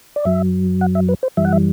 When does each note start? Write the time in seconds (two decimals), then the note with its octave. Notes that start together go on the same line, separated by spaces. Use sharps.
0.16 D5
0.25 F#2 F#3 E5
0.81 F#5
0.95 E5
1.09 B4
1.23 C5
1.37 F#2 E3 G3 E5
1.45 F#5
1.52 E5